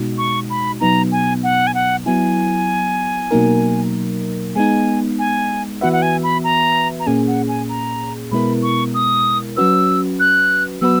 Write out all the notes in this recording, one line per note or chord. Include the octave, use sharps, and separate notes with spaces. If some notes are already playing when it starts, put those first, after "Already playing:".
Already playing: B2 G#3 D#4 F#4
C#6
B5
B2 F#3 B3 D#4 A#5
G#5
F#5
G#5
F#5
F#3 B3 E4 G#5
B2 F#3 A#3 D#4 A#4
G#3 B3 D#4 G#5
G#5
E3 B3 F#4 B4 E5 F#5
F#5
G#5
B5
A#5
A#5
A#2 A#3 C#4 G#4 G#5
F#5
G#5
A#5
B2 G#3 B3 E4 A#4 B5
C#6
D#6
F#3 C#4 F#4 B4 E6
F#6
F#3 B3 F#4 B4 E6